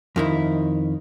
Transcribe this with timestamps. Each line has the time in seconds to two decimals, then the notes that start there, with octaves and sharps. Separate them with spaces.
0.16 F2 D#3 E4